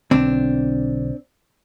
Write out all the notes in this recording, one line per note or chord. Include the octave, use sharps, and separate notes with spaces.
B1 D3 C4 D4